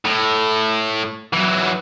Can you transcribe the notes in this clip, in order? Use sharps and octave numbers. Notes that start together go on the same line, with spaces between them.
A2
E3 F#3